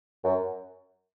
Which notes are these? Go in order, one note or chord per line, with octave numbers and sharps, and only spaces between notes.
F#2